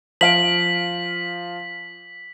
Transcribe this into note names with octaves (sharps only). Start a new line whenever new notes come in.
F3 F5 B6 D7 F#7